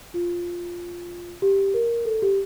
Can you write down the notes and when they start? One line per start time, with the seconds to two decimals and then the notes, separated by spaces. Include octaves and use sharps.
0.14 F4
1.42 G4
1.74 A#4
2.05 A4
2.22 G4